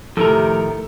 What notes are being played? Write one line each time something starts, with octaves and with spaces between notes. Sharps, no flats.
A2 C3 D#3 F3 A3 A4 A#4